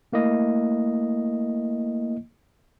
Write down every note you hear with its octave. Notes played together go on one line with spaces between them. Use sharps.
A3 A#3 E4 D#5